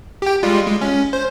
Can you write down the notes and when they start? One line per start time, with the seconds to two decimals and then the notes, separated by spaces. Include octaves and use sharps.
0.22 G4 G5
0.43 G3 G#3 F4
0.67 G#3
0.81 C#4
1.13 C5